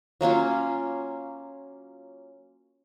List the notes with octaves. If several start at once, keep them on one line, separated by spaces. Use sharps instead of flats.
F#3 A#3 C#4 F4